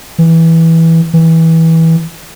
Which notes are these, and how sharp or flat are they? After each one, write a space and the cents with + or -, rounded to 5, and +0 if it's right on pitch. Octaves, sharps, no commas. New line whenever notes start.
E3 -10
E3 -20